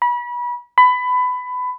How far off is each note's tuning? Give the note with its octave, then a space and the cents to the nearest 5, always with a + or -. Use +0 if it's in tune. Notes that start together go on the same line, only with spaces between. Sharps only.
B5 -30
B5 +20